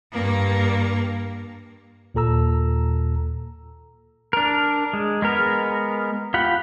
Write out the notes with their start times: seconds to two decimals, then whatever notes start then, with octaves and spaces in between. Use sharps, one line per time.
0.12 G2 A#3
2.14 D#2 A#2 A4 A#5 E6
4.33 D4 A#4
4.93 G#3
5.22 G#3 B3 A#4
6.34 F4 G4 F#5 B5